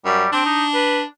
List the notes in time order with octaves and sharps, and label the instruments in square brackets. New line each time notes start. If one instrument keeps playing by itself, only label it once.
[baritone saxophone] F#2 [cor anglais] G3
[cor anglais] C4 [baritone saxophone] D4
[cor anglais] D#4
B4